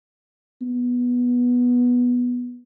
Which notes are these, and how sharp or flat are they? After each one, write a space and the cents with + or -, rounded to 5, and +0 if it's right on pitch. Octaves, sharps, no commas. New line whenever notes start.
B3 -10